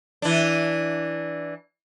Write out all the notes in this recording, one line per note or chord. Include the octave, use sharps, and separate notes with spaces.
E3 D4